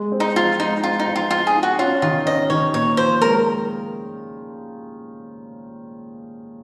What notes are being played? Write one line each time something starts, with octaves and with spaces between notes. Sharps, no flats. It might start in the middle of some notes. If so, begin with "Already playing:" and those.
Already playing: G#3
C4
D#4
F3 F4
G#3 D#4
C4 F4
D#4
F3
F4
D#4 F4
G#4
D#4
F#4
C#4 F4
D#3 F4
C#4 D#5
D#3 C#5
A#2 C#5
F3 C5
G#3 A#4